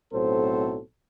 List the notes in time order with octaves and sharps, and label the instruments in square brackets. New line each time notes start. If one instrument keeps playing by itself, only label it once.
[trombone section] B1 A2 F#3 C4 A4 C5